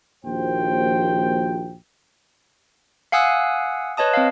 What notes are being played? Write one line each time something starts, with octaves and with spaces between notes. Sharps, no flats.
A#1 D#2 F3 F#4 C5 G5
F5 F#5 G#5 D#6 E6 F#6
B4 C#5 D#5 A5 D#6
C4 D#5 F5